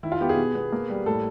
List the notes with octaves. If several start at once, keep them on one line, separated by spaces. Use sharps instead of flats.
D#3 E4
F4
B3 G4
G#4
B2
B3
A#3
G3
A2 A4